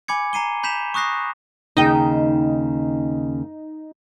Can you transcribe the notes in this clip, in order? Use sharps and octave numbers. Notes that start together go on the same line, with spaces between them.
G#5 B5 D6 G#6 C#7
A#5 C7 D#7 G7
B5 G6 B6 E7 F7
C#6 D#6 F#6 A#6 C7
D#2 C#3 D#4 G5